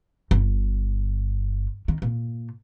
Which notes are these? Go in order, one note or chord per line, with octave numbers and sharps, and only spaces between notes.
G1
D#3
A#2